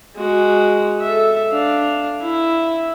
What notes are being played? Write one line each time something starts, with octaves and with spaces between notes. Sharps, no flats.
G#3 F#4
A4 E5
D4 F5
E4